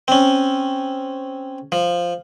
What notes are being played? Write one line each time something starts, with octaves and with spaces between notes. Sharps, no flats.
C4 C#4
F3